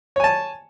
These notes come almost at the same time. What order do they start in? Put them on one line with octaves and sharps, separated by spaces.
C#5 G#5 A5